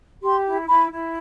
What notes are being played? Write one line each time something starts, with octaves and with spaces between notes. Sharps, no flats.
G4 C6
E4
E4 B5
E4